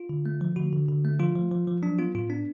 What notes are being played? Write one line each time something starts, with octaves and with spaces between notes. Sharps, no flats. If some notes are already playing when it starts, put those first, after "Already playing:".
Already playing: F4
D3
A3
F3
D3 F#4
D3
D3
A3
F3 F4
F3
F3
F3
F#3 D4
B3 F4
A2 F4
B3 D4